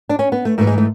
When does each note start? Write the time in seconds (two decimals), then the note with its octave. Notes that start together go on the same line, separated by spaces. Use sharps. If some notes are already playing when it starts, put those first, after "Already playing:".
0.09 D4
0.19 C#4
0.32 B3
0.45 A3
0.58 G#2 E3 A3
0.67 G#3
0.78 A3